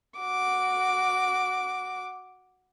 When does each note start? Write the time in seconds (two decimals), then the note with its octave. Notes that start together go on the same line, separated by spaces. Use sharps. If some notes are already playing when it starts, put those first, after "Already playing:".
0.19 F#4 D6